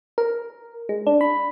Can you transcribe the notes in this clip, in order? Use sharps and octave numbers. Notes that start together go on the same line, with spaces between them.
A#4
G#3
D4
B5